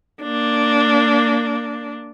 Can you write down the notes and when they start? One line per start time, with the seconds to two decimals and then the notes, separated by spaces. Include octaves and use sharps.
0.22 A#3 D4